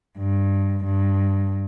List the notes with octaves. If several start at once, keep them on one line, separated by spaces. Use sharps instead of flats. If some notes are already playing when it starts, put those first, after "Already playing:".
G2
G2